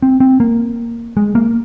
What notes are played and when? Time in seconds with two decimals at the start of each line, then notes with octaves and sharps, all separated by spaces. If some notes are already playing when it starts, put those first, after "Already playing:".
0.02 C4
0.20 C4
0.40 A#3
1.17 G#3
1.35 A#3